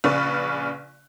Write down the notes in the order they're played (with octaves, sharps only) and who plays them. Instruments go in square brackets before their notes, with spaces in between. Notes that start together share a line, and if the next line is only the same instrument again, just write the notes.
[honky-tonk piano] A#1 C#3 B4 D5 C#6